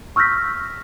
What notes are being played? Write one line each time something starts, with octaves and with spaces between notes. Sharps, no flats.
C#6 E6 F6 G6 A#6 B6